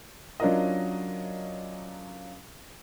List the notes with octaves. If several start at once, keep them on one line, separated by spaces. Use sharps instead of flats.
F#3 C#4 D4 F4 A#4 D#5